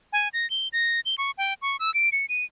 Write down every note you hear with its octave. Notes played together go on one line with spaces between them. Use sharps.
G#5
A#6
G7
A#6
G7
C#6
G5
C#6
E6
D7
C#7
D#7